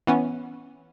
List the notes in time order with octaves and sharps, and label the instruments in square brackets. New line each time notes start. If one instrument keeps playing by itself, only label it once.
[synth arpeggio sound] E3 B3 C#4